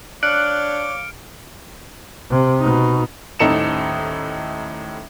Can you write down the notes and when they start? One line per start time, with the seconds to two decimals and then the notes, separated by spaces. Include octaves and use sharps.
0.23 D4 C#5 F5 D6 F6 F#6 C#7 D7
2.30 C3
2.60 B2 D#4
3.39 D#1 A2 D#4 A4 C#7 E7